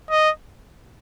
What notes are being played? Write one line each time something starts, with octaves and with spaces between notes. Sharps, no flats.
D#5